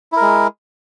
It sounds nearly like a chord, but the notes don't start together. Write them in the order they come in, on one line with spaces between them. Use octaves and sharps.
E4 A#4 G#3